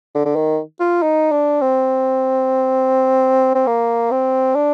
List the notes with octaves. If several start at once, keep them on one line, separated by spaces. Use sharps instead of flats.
D3
D3
D#3
F4
D#4
D4
C4
C4
A#3
C4
D4